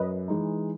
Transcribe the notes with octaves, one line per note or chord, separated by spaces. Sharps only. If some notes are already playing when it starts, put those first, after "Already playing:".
Already playing: F#2 B4 D#5
E3 G#3 D#4